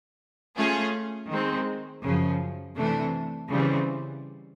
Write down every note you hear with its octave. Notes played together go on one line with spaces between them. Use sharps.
A3 C#4 F4 G#4
D#3 G#3 C4
F#2 C#3 F3
C3 E3 A3 D4
C#3 E3 G3 C4